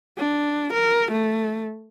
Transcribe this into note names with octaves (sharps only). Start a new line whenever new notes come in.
D4
A#4
A3